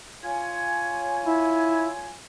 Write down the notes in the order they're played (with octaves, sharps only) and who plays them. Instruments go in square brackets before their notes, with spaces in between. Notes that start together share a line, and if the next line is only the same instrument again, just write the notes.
[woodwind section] F4 C#5 G#5
[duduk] E4